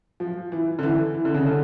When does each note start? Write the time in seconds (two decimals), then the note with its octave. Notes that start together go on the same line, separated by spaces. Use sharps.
0.20 F3
0.52 E3
0.79 D3
0.83 E3
1.14 E3
1.25 D3
1.35 C#3
1.45 D3